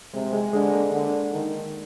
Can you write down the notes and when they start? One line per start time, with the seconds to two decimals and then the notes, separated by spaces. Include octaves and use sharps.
0.13 C3 G#3
0.33 G#3
0.53 D3 G#3
0.73 A#3
0.92 D3
1.32 D#3